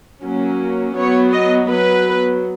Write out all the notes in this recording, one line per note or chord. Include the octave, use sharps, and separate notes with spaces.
F#3 A#3 C#4
F#3 B3 C#5
D#5
F#3 B3 B4